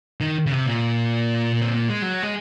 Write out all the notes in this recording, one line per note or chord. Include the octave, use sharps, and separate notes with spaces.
D#3
C#3
C3
A#2
C4
A#3
G#3
F#3
G#3